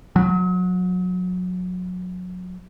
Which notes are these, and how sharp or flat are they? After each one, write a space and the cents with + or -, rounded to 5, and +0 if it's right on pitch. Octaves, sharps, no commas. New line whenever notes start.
F#3 -25